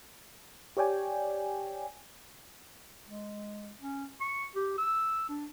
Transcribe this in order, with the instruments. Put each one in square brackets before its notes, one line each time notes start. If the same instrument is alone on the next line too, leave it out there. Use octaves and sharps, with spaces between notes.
[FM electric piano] G4 C#5 D5 G5 G#5
[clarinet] G#3
C#4
C#6
G4
E6
D4